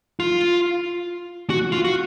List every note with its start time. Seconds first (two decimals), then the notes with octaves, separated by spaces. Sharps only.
0.20 F4
1.50 F#4
1.72 F4
1.85 F#4